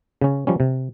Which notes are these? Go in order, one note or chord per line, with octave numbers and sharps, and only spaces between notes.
C#3 C#4
F3 G3 C#4
C3